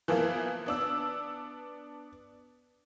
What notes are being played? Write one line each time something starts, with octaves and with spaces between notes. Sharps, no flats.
E3 F3 A#3 B3 E4
B3 D4 E6